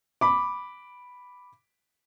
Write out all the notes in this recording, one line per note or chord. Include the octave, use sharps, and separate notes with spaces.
B5 D6